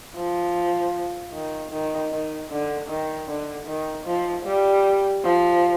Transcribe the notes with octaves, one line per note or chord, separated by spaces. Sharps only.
F3
D#3
D#3
D#3
D3
D#3
D3
D#3
F3
G3
F3